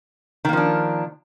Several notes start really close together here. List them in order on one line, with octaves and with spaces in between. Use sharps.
D#3 A#3 F3 D4